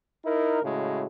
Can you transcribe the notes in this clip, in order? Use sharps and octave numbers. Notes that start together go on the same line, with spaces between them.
D#4 E4 A#4
A2 C#3 G#3 F#4